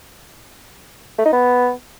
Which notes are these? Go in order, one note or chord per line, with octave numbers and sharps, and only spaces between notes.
A3
D#4
B3